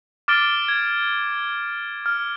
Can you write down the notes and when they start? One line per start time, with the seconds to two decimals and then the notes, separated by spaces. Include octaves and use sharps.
0.28 D6 F6 A6 D7 G7
0.68 G#6
2.06 F6